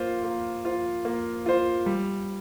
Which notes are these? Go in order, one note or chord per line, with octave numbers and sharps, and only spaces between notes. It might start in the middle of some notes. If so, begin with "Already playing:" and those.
Already playing: A#3 F4 C5
A#3
F4 C5
A#3
F4 C5
G3